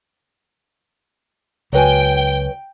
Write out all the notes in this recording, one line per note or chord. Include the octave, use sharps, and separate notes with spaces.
C#2 F#3 B4 G5 G#5